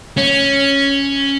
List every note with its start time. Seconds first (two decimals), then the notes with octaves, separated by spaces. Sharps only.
0.17 C#4